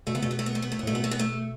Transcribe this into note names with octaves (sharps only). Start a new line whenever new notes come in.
B2 A3
C#3 B3
B2 A3
B3
A3
B3
A3
B3
A3
B3
A2 A3
B2 B3
A3
B3
A3